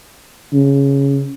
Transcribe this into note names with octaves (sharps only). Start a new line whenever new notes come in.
C#3